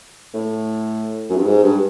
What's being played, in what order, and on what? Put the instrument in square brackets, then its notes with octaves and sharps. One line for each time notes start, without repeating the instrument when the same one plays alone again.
[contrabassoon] A2
F#2
G2
G#2
G2